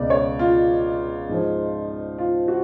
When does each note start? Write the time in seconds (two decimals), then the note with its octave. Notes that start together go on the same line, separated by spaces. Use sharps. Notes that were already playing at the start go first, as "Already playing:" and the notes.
Already playing: C#2 B2 D5
0.10 C#5
0.39 F4
1.29 G#2 F3
2.18 F4
2.48 F#4